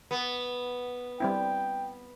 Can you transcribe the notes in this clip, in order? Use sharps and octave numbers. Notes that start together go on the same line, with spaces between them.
B3
G3 C4 E4 G5